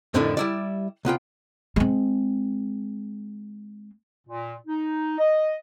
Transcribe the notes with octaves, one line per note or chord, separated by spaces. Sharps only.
F2 A2 D3 D#3 D4 E4
G3 E4 D5
C2 B3 F4 G5
G#3 C4
A#2
D#4
D#5